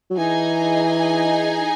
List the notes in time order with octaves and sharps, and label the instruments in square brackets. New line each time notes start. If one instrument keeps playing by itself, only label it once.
[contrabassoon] F#3
[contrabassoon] E3 [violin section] D#4 G#4 D#5 G#5